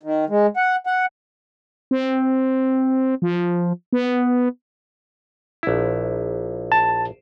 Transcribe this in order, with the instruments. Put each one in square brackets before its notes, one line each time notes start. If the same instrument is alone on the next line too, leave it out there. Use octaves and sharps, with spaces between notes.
[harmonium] D#3
G#3
F#5
F#5
[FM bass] C4
F3
B3
[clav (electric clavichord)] A#1 E4
[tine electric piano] A5